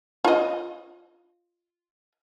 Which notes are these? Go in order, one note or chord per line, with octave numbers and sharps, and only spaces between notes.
F4 D#5